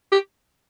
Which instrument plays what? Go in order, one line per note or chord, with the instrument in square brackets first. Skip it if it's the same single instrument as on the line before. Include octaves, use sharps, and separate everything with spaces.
[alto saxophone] G4